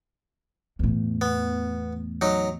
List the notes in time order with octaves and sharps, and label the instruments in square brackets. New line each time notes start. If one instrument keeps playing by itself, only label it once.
[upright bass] E2 A2
[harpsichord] B3
F#3 D#4